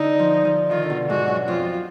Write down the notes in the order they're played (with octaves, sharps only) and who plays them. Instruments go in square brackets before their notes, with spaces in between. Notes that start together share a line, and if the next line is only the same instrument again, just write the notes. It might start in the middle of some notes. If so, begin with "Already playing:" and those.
Already playing: [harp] D3 [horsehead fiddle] D#4
[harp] F3
F3
[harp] D#3 [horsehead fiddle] F4
[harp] D3
B2
[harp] G#2 [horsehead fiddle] F#4
[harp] F#2
[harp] F2 [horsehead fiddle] F4